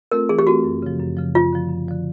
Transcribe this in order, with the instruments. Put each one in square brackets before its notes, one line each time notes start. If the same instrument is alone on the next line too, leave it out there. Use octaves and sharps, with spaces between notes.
[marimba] A3 C4 F4 A4 [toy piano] A#4
[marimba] E3 [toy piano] G#4
[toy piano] G4
[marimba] A3 C4 F4 A4 [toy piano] F#4
[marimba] F#2
C#3 F3
F#2
C#3 F3
[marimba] F#2 [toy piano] F4
[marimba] D3 F3
F#2
D3 F3